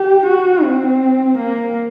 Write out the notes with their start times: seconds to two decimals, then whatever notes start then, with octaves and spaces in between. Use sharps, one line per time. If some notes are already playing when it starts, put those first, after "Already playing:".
Already playing: G4
0.26 F#4
0.64 C4
1.38 A#3